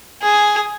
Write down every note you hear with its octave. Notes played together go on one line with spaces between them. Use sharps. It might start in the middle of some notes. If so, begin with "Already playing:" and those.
G#4